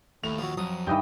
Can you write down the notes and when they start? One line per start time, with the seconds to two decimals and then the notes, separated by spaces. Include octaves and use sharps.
0.24 D#2 A2 F7
0.38 F3 F#3
0.57 F2 F#3 D#6
0.87 G2 D#3 E3 D#5 G5